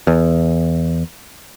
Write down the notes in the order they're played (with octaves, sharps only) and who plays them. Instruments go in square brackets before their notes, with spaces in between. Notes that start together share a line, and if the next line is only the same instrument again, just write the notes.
[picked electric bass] E2